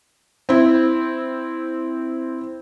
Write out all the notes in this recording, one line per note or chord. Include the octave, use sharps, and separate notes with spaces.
C4 E4